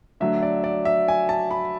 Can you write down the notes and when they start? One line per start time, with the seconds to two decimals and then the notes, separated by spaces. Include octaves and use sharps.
0.20 D3 F#3 A3 E5
0.42 D5
0.64 D5
0.85 E5
1.08 G#5
1.29 A5
1.51 B5